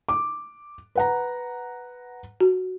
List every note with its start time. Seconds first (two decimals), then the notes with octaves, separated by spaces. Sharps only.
0.09 D6
0.95 B4 F#5 A#5
2.41 F#4